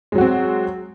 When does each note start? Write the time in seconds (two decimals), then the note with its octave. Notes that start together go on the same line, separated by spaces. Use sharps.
0.12 G#3
0.15 F#3
0.18 F#4
0.21 C4